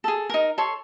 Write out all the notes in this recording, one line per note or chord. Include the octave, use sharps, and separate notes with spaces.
G#4 A4
D#4 A#4
A4 C#5 C6